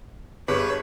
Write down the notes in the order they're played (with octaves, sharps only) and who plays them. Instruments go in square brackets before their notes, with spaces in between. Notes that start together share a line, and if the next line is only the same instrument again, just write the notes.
[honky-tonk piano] G1 [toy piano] G4 G#4 [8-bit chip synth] B4 [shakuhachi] C#5